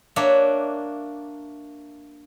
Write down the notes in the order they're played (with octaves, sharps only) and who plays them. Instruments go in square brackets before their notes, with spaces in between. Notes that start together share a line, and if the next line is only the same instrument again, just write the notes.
[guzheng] A#3 D4 C#5 E5 F#5